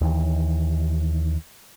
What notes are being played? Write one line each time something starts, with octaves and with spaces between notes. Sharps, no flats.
D#2 D#3 E3